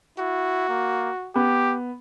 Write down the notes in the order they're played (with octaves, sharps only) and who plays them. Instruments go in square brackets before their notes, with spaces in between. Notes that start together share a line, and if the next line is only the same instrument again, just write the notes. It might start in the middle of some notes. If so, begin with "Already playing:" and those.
[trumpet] E4 [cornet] F#4
[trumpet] A#3
[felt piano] B3 [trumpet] G4